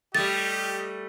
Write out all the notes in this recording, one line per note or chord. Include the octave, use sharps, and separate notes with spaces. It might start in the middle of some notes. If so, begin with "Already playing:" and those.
G3 A3 G4 D#5 A6